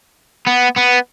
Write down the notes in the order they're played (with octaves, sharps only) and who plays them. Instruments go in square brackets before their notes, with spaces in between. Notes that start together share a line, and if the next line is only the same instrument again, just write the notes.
[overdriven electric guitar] B3
B3